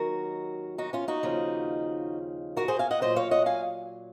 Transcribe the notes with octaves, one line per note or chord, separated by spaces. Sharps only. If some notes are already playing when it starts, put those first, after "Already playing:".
Already playing: D#2 D#3 F#3 F#4 A#4
D#4 F#4
C#4 F4
D#4 F#4
D#2 C#3 F3
F#4 A#4
G#4 C5
F5 G#5
D#5 F#5
A#2 F#3 C5 D#5
C#5 F5
D#5 F#5
F5 G#5